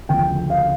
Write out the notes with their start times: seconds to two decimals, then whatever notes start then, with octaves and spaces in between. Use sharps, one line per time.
0.09 D2 C#3 F3 G5
0.50 F5